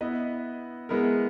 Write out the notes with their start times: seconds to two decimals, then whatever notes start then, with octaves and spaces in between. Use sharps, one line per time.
0.01 B3 E4 B4 D#5
0.89 G#3 B3 E4 A#4